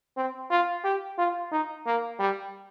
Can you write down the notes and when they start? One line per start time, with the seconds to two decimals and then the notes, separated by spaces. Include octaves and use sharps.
0.17 C4
0.51 F4
0.84 G4
1.18 F4
1.52 D#4
1.86 A#3
2.20 G3